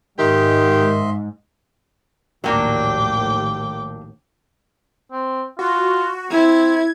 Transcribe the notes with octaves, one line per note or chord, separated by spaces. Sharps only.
G#2 D#3 G4 D#5 E5 C6
A#1 D#2 A2 F#3 A#3 D4 G5 D6
C4
F4 F#4
C4 E4 G#6